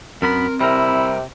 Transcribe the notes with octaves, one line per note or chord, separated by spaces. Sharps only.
F#2 B3 C4 A#4 B5
C3 G3 E4 A#4